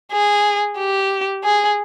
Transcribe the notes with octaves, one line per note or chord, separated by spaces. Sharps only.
G#4
G4
G#4